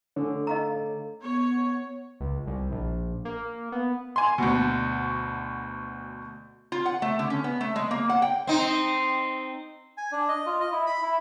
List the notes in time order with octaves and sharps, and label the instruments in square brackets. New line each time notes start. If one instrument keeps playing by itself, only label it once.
[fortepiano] D3 [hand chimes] A3 A4 G#5 [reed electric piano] C#5
[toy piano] D#5 F5 A#5
[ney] B3 [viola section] C#5
[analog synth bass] C#2
C2
A#1
A#3
B3
[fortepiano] G#5 C6
D2 B2
[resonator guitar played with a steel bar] F4
F#5
A3
D3
C#4
B3
A3
G#3
A#3
F#5
G5
[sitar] C4 D#4
[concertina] G#5
D4
D#5
F4
D#5
E4
B5
E4